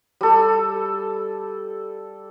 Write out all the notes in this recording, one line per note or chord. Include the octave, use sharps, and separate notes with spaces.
G3 A4